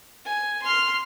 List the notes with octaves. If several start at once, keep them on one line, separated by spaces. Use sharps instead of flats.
G#5
C6 F6